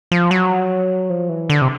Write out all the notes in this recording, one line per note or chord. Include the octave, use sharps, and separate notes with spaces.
F3
F#3
F3
E3
D3
C3